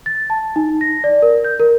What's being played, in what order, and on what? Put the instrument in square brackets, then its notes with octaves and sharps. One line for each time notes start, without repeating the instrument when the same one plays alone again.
[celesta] A6
A5
D#4
A#6
D5
A#4
G6
A#4